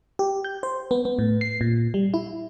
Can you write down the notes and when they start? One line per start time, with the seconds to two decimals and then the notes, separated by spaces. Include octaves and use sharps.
0.19 G4
0.44 G6
0.63 C5
0.91 B3
1.05 B3
1.19 A2
1.41 C7
1.61 A#2
1.94 G3
2.14 E4